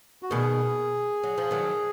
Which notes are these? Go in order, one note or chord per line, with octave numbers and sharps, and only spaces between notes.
F#4
B2 D#3 G#4
F#3
F3
D#3 F#3